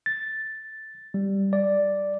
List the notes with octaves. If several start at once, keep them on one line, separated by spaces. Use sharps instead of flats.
A6
G3
D5